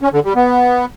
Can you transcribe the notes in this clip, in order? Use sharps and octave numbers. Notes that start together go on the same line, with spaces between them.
C#4
D3
G3
B3